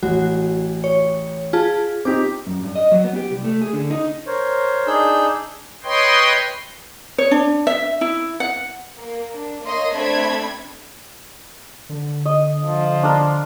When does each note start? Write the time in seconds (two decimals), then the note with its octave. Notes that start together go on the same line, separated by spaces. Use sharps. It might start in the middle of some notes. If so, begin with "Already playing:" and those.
0.03 A1 F#4
0.84 C#5
1.53 F4 G#4 A5
2.05 C4 D#4 G4 D6
2.47 F#2
2.63 G2
2.76 D#5
2.92 F#3
3.04 B3
3.16 G4
3.31 C2
3.44 A3
3.62 G#4
3.73 D3
3.90 D#4
4.27 A#4 C5 C#5
4.87 D4 D#4 G#4 E6 G6
5.84 B4 C#5 D#5 G5 C6
7.18 C#5
7.31 D4
7.67 E5
8.01 E4
8.40 F#5
8.98 A#3
9.34 D4
9.65 A#3 C#5 D#5 C6
9.94 A3 C4 D4 A4 B5 G#6
11.90 D3
12.25 D#5
12.67 F3
13.03 D4 A#4